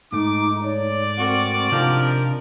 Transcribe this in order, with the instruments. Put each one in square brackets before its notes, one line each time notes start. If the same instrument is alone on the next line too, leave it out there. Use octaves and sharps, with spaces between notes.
[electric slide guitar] G#2 A3 [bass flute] D#4 [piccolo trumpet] D6
[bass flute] C#5 [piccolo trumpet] D5
[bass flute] C4 [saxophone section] F#4 A#4
[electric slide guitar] C3 D4 D#4 [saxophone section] F3 A#4